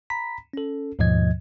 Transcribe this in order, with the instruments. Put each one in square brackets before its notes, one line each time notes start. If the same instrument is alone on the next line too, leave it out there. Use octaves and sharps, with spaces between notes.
[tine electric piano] A#5 B5 B6
C#4 A4
D#2 G#2 B2 F3 D#5 G#6